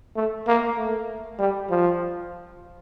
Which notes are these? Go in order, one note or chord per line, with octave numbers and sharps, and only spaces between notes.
A3
A#3
A3
G3
F3